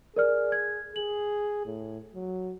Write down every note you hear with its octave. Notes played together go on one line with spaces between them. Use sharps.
G#4 A#4 D5 F6
G#6
G#4 F#7
A2
F#3